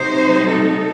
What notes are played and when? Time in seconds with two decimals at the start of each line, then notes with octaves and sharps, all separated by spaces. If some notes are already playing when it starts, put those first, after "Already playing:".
Already playing: C3 F#3 A3 D#4 C5
0.48 A4